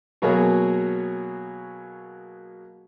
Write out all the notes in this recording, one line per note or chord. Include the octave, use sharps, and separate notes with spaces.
B2 F#3 A#3 G#4